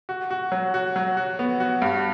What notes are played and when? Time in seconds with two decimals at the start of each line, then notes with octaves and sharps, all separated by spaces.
0.09 F#4
0.31 F#4
0.52 F#3
0.74 F#4
0.96 F#3
1.17 F#4
1.39 B3
1.60 F#4
1.82 G2